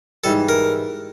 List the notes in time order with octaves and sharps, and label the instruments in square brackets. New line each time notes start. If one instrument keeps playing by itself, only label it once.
[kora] G#2 E3 G3 [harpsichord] A4
[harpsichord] A#4